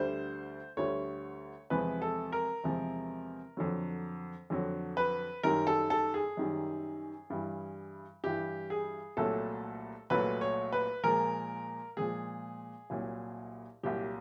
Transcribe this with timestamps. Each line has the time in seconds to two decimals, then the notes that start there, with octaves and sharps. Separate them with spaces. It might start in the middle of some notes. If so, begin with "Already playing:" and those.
Already playing: D2 D3 G3 C5
0.77 D2 D3 G3 C#5
1.70 E2 C3 F3 G#3 B4
2.02 A4
2.32 A#4
2.64 E2 C3 F3 G#3
3.57 F2 D3 F#3
4.50 F2 D3 F#3
4.97 B4
5.43 F#2 D#3 G3 A#4
5.67 A4
5.90 A4
6.14 G#4
6.37 F#2 D#3 G3
7.30 G2 E3 G3
8.24 G2 E3 G3 G4
8.70 G#4
9.17 C2 A#2 F#3 A3 A4
10.10 C2 A#2 F#3 A3 B4
10.41 C#5
10.73 B4
11.04 A#2 F3 G#3 A#4
11.97 A#2 F3 G#3 G#4
12.90 C2 A#2 F#3
13.83 C2 A#2 F#3 G4